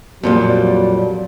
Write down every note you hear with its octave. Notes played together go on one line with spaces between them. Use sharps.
F2 A#2 F#3 G3